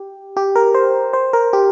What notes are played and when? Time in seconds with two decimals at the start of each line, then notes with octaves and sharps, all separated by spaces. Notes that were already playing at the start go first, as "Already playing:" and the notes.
Already playing: G4
0.37 G4
0.55 A#4
0.74 C5
1.13 C5
1.33 A#4
1.53 G4